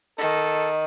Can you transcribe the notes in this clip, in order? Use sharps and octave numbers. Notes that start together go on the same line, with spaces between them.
D#3 A4